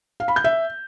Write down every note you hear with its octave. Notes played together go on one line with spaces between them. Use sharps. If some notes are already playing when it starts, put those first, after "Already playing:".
F5
B5
G6
E5